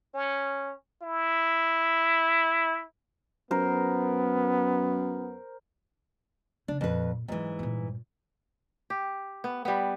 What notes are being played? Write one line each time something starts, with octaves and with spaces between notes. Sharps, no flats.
C#4
E4
F#2 B3 A#4 C5
C#3 D4
F2 A#2 B4
G#2 E3 F#3 C#4
G2 A#2
G4
B3
G3 B3